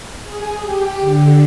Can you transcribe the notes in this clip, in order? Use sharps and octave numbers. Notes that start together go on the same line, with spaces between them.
G#4
G4
D3